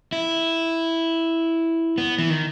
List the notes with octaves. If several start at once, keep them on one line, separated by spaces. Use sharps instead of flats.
E4
B3
E3
D#3